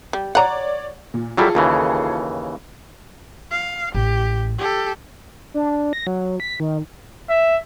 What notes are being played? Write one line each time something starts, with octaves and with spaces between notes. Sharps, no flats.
G3
C#5 D5 F#5 A#5
A#2
F#3 G3 E4 F4 G#4 A4
D#2 C#3 E3
F5
A1 G4
G4 A4
D4
A#6
F#3
B6
D#3
E5